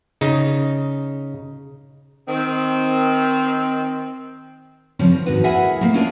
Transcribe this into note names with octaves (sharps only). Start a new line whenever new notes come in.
C#3 D#4
D#3 C4
C#3 E3 F3 G3 C4 C#4
A#4
D#2 G#2 D#4 F#4 B4
E4 G#4 A#4 E5 F#5 G#5
A3 A#3 F5
C#4 D4 F4 G#4 A#4 D5